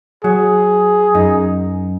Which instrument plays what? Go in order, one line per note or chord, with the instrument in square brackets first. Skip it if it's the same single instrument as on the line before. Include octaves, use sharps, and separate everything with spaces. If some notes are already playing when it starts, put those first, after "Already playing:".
[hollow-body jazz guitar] F#3 [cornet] G#4
[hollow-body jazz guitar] F#2 D#4